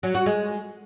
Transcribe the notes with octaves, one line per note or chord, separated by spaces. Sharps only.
F#3
F#4
G#3